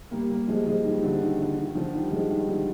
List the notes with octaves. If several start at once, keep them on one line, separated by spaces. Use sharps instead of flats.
G3 A#3
G3 A#3
F3 G#3
F3 G#3
D#3 G3
D3 F3
D#3
D3
D#3
D3 F3
D#3 G3
F3 G#3
D#3 G3
D3 F3